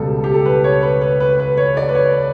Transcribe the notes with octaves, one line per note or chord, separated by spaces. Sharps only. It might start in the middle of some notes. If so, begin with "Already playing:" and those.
Already playing: C#2 B2 G3 A4
G4
A4
B4
C#5
B4
B4
B4
B4
C#5
D5
B4
C#5